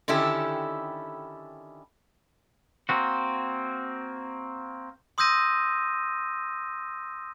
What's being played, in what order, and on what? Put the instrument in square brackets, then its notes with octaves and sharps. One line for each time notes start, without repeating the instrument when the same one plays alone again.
[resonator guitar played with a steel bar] D3 D#3 C#4 E4 G4 A4
[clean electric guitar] A#3 C4 F#4
[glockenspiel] C6 D#6 E6 G6 A#6 D#7